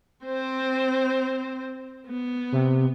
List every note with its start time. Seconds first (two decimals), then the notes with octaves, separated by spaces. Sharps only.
0.25 C4 C5
2.07 B3
2.52 C3